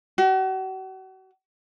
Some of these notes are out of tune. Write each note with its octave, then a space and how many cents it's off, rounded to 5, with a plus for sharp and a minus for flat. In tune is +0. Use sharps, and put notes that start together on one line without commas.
F#4 +40